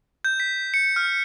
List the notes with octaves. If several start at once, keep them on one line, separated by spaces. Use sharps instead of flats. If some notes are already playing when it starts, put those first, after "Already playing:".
G6
B6
C#7
F6